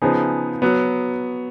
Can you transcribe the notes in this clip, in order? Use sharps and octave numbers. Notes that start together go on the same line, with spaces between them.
C#3 F3 B3 D#4 G#4
F#3 B3